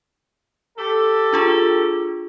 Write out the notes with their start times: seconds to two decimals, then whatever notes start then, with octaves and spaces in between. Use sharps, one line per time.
0.78 G4 A4
1.33 D4 F4 G#4